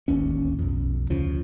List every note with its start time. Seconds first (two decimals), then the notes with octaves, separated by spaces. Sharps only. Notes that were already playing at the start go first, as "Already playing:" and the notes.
0.08 D1 G#1 D#2 C#4
0.59 B1 F2
1.10 D2 C#3 F3